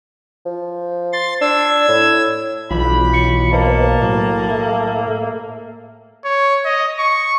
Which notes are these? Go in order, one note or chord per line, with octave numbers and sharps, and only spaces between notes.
F3
C6 A6
D4 E6 G#6
A2
B1 E3 D4 F4 G5 B5
C#6
A#3 B4 C5 D#5 A5
A2 F#3
A4 E5
C#5
D#5
C#6